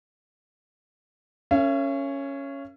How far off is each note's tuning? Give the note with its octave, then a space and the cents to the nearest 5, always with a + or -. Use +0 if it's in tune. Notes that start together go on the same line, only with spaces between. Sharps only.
C#4 +0 A#4 -25 E5 +45